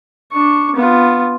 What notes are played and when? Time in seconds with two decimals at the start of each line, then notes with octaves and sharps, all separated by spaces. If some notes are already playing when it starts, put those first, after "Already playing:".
0.32 D4 C#6
0.75 B3 F4